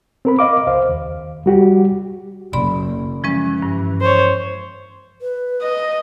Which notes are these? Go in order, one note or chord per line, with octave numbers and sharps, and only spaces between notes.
C4 A#4 B5
D#5 F5 D6
C#2 C5 F5
D#2
G3 F#4 G4
F#1 D5 B5 C6
E3 F3 G#3 C#4
G2
C5 C#5
B4
D#5